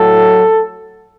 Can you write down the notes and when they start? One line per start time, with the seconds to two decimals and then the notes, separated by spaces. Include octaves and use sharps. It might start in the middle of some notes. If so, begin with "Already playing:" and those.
Already playing: A2 F#3 A4